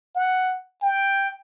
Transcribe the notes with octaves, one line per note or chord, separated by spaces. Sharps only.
F#5
G5